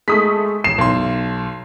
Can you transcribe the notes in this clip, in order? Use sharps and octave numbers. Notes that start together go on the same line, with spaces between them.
G#3 A3 D#6 B6
A1 C7 E7
B1 C6